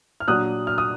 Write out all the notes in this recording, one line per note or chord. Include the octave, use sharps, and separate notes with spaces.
F6
A#2 F#3 D4 D#6 F#6
F6
D#6